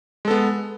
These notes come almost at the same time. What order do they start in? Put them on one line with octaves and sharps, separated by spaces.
G#3 A4 B3